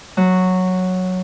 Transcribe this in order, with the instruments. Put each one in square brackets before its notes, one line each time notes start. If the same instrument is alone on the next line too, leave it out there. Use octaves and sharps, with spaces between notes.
[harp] F#3